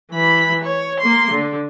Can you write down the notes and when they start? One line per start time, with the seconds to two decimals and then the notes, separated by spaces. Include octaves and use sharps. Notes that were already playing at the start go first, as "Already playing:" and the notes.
0.12 E3 B5
0.64 C#5
1.00 A#3 C6
1.31 D3